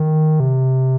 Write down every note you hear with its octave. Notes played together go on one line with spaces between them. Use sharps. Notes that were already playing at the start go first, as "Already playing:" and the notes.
Already playing: D#3
C3